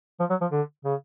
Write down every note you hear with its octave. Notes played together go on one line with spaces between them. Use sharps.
F3
F#3
F3
D3
C#3